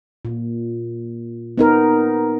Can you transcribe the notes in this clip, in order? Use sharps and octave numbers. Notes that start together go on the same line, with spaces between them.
A#2
B3 D#4 A#4